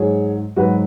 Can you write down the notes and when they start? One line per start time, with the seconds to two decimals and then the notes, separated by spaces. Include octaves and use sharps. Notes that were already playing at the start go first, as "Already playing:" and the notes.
Already playing: G#2 F#3 G#4 C#5
0.56 G#2 F#3 F#4 B4